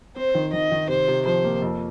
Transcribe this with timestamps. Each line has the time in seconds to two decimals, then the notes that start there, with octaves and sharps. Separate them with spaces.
0.16 C4 C5
0.35 D#3
0.53 D#3 D#5
0.72 D#3
0.89 C3 C5
1.08 C3
1.26 F3 C5
1.44 A#3
1.62 F2